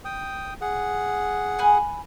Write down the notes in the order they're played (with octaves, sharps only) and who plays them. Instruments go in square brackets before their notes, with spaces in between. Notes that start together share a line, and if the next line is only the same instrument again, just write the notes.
[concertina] G5 D#6
G#4 F#5
[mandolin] G#5 B5 F#6